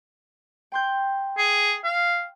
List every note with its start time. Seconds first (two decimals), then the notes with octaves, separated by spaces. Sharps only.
0.72 G5 C6 G6
1.38 G#4
1.84 F5